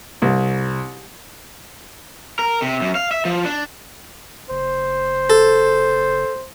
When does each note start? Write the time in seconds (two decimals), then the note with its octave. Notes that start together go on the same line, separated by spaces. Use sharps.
0.22 C2
2.39 A#4
2.62 C3
2.81 F#2
2.95 F5
3.11 E5
3.25 F3
3.45 D4
4.50 F#1 C5
5.30 A4